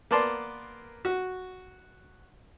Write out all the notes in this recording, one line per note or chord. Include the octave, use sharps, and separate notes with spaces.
A#3 B3 D5 A5 C6
F#4